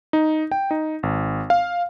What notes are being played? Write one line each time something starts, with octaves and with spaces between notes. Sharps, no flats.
D#4
G5
D#4
G#1
F5